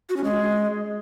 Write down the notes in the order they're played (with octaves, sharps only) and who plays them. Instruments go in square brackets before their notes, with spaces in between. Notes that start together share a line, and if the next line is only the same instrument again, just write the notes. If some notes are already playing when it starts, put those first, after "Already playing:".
[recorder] F#4
C#4
G#3